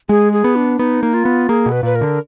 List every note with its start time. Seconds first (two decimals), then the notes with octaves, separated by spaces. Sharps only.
0.09 G#3 G#4
0.33 G#4
0.44 B3
0.56 D4
0.79 B3 D#4
1.03 A#3
1.14 F4
1.25 B3
1.49 A#3 G#4
1.66 B2
1.72 B4
1.83 A#2 B4
1.95 A#4
2.01 D3